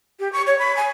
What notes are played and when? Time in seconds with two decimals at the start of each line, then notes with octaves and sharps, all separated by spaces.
0.20 G4
0.33 C#6
0.47 C#5
0.59 B5
0.77 G#5